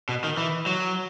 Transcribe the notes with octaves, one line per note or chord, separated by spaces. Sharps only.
B2
D#3
E3
F#3